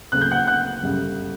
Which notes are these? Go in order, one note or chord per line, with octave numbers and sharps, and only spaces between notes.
D2 C#3 F#3 A#3 F#6
G6
F#5 F#6
F#5 F#6
G1 F#2 C#3 G3